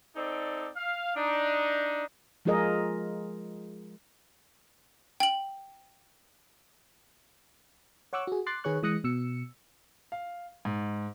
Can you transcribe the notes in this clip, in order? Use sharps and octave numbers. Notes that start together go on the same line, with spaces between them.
C4 D#4 A4 D5
F5
D4 D#4
F3 G#3 F4 G#4 A#4 D#5
G5 F#7
C#5 F#5 C#6 D6 E6 F#6
F#4 G#4
C6 D6 F#6 A6 C7
D#3 G#4 B4 C#5 C#6 F#6
E3 G#3 D#6 F#6 A#6 C#7
B2 E6 C#7
F5
G#2